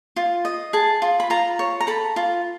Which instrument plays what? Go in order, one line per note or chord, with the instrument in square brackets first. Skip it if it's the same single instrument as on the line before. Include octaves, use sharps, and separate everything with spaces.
[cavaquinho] F4
D#5
G#4 A5
F4
B5
F4 A#5
C#5
A#5
A4 B5
F4